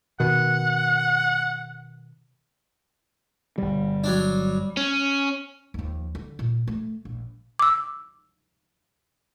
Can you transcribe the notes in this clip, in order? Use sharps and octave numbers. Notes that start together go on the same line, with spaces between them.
B2 D#3 F#5
G1 B2 G3
F#3 D4
C#4
D#2 F3
D3
A#2
A3
A#1
D6 E6